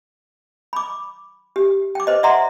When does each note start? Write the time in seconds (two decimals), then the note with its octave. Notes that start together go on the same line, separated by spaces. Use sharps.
0.73 B5 D6
1.56 G4
1.95 G5 D6
2.07 B4 C5 D#5
2.23 D5 E5 F#5 A#5 C6